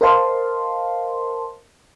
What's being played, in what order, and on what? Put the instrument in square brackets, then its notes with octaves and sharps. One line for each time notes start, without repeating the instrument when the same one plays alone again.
[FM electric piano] A#4 C5 D#5 F5 A5 C6